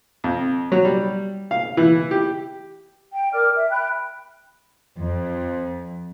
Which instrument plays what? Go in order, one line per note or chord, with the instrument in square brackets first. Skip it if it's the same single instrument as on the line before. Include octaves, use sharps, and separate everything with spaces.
[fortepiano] F2
F#3
G3
F5
E3
G4
[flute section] G5
A#4 D5 D6 F6
E5
G5 B5 F#6
[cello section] F2